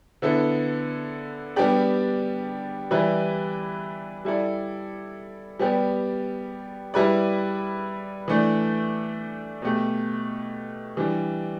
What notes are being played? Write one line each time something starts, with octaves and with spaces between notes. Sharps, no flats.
D3 B3 E4 A4
G3 B3 D4 G4 D5
E3 G3 E4 B4 D5
G3 E4 A4 D5
G3 B3 G4 D5
G3 E4 B4 D5
E3 A3 D4
B2 A3 G4
E3 G3 D4